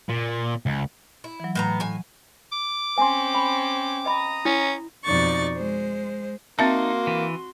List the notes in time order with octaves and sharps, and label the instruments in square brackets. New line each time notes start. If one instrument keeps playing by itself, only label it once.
[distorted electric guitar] A#2
C#2
[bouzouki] E4
[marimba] E3 F#3
[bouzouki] A2 B3 A#5
A2 G#5
[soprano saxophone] D6
[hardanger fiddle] C4 C#4 [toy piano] G#5 C6
[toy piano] B5
[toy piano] D#5 B5 [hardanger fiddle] A#5 D#6
[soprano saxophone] C#4 [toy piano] E4
[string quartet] F2 B2 D#4 D5 C#6 A6
G#3 C5
[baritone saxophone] A#3 [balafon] C4 E5 A5 [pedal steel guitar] D#4 [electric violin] F#4 C6
[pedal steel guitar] E3